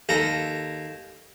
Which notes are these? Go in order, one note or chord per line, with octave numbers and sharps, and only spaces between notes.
D#2 A4 A#5